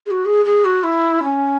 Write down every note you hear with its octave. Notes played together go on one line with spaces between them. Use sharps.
G#4
F#4
G#4
G#4
F#4
E4
C#4